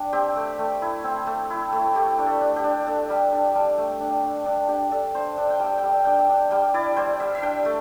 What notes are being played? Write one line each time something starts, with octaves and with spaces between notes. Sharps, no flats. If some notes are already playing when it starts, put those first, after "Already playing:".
Already playing: G3 D4
C4 G4
A3
A3
E4
C4
A3
E4
A3
A3 G4
D4
A4
D4
G4
D4
D4 A4
G3
D4
G3
A3
D4
D4
D4
D4 G4
D4 A4
D4 C5
D4 E5
G5
G3 E5
G5
G3
E5
D4 G5
E5
D4
G3 G5
E4 D5
G3 C5
G3 E5
E5
D4 G5
A3